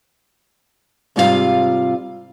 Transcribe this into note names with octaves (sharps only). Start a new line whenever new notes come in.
G#2 C3 G3 F4 A4 F5